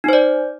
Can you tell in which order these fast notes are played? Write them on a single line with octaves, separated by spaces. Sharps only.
D#4 C5 D5